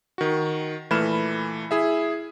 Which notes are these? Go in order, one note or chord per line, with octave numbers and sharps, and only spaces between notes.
D#3 F#4
A#2 E3 A3 B5 F6 E7
E4 G#4 E5